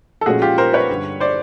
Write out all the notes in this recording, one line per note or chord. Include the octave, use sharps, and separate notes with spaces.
A4
A#2 F3 G#3 C#4 F#4 G#4
F4 G4
A#4 C5
B4 C#5
G2 D3 G3
C5 D5